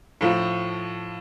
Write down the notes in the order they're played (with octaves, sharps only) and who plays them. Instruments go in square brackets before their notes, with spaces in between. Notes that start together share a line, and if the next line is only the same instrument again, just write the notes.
[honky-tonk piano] A2 F3